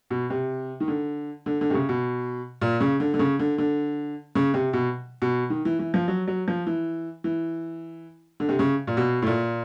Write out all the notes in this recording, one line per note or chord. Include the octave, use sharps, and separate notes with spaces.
B2
C3
D#3
D3
D3
D3
C3
C#3
B2
A#2
C#3
D3
D3
C#3
D3
D3
C#3
C3
B2
B2
D#3
E3
E3
F3
F#3
F#3
F3
E3
E3
D3
C3
C#3
A#2
B2
A2
A#2